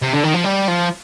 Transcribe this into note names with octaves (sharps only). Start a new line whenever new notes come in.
C3
D3
D#3
F3
G3
F3